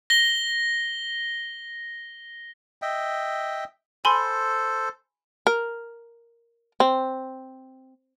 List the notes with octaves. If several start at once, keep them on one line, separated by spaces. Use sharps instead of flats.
A#6 G7
D#5 E5 G5
A4 C5 G#5 B5 C6
A#4
C4